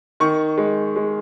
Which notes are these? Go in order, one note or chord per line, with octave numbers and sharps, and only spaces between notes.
D#3 C#6
G#3
G#3